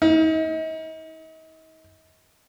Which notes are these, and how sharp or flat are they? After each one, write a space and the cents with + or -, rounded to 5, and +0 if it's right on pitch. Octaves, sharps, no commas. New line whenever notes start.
D#4 +40